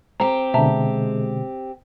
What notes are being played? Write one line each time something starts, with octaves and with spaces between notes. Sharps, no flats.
C4 G4 A#5
B2 D3 G#3 E5 A5 A#5